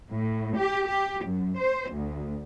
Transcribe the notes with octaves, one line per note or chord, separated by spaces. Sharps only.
A2
G4
G4
F#2
C5
D2